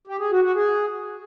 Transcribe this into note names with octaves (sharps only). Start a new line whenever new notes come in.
G4
G#4
F#4
F#4
G#4